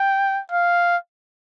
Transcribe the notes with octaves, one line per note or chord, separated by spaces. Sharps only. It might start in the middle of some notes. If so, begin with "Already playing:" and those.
Already playing: G5
F5